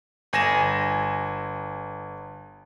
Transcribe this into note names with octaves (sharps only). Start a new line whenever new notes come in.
G1 G#5 A#6 E7